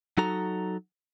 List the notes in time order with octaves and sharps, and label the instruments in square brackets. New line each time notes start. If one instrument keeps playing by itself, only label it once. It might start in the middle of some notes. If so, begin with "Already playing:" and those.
[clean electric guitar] F#3 D#4 F#4 A4 A#5